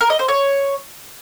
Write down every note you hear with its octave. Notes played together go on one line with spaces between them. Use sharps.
A#4
D#5
C5
C#5